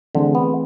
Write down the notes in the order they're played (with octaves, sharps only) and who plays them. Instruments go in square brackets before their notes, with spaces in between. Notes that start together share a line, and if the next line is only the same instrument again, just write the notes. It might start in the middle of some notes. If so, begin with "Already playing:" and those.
[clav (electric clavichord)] D3 [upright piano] E3 A3 C4 G#4
[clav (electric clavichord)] B3